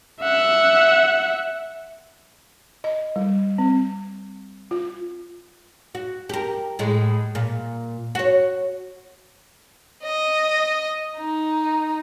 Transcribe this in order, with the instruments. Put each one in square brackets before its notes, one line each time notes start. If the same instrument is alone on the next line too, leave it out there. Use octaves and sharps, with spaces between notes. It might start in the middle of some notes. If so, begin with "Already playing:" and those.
[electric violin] E5 F#5
[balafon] D#5
G3
C4
F4
[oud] F#4
G4 A#4
A2 G#3
A#2
F#4 C#5
[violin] D#5
D#4